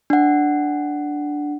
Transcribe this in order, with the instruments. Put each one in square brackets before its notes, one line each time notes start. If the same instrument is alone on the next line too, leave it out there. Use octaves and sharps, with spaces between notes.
[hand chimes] D4 F#5